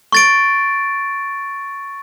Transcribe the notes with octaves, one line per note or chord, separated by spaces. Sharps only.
C#6 A6 D7